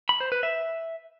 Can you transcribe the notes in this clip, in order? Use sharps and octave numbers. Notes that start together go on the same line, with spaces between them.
B5
C5
B4
E5